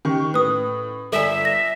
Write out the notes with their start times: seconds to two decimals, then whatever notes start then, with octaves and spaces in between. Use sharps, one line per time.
0.05 D#3 C#4 G4 C#6
0.34 A2 B4 D#6
1.12 G1 A4 D5 E5 G#5
1.45 A#6